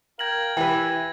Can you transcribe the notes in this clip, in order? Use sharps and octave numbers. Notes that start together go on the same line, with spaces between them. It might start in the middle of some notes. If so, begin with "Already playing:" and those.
A#4 F5 G5 G#6 A#6 F#7
E3 E4 G4 B4 G5